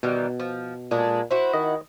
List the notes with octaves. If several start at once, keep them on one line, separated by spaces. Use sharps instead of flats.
B2 D#3 E3 G3
F3
A#2 G#3 A3 D4
E4 F#4 C5
D#3 D#5